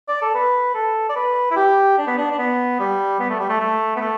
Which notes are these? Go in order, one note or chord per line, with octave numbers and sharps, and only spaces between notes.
D5
A4
B4
A4
D5
B4
E4
G4
D4
B3
D4
D4
B3
G3
B3
A3
G3
A3
A3
B3
A3